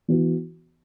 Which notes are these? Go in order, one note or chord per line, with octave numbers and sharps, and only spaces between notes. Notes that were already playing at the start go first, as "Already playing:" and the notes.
E3 B3 F#4